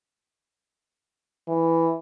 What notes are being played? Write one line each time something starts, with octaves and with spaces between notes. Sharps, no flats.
E3